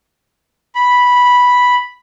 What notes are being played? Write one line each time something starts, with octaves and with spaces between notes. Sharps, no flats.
B5